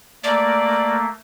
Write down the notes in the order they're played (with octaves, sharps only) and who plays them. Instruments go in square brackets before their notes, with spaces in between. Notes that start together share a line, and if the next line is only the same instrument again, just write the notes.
[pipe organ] A3 A#3 [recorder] D5